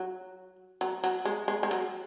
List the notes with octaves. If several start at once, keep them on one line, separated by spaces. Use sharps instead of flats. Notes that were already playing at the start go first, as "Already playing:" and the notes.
Already playing: F#3
F#3
F#3
G#3
G#3
G#3
F#3